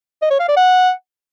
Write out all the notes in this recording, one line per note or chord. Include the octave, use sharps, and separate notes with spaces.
D#5
C#5
F5
D5
F#5